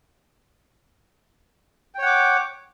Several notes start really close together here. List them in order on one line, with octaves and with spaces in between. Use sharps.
G5 C#5 F#5 D6